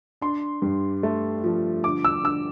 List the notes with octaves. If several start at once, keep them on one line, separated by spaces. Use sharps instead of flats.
D4 C6
G2
A3
F3
D3 D6
E6
D3 E6